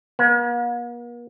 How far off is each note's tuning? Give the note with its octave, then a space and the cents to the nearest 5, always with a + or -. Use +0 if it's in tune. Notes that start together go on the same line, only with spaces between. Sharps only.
A#3 +45